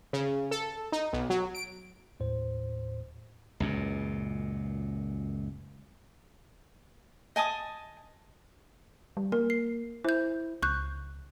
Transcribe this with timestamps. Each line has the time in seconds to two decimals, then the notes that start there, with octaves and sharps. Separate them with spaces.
0.13 C#3
0.51 A4
0.92 D#4
1.13 B1
1.30 F#3
1.55 D7
2.20 D#2 A2 C5
3.60 C#2 F#2 A#2
7.36 D#5 G#5 A5 D#6
9.17 G3
9.32 A#3 A#4
9.50 C7
10.04 E4 C5 G6
10.62 C#2 C#6 F#6 G6